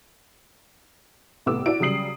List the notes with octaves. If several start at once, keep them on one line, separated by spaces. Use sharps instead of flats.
C2 A2 B3 D6 E6
E4 F#4 D5 D7
C#3 F#3 G3 D#6 C7 F#7